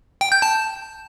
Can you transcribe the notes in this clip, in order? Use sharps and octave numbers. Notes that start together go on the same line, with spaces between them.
G5
G6
A5